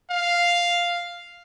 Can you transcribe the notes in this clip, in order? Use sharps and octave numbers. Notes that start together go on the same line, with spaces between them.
F5